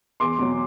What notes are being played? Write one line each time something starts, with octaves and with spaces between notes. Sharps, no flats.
E2 C6 D6
B2 F#3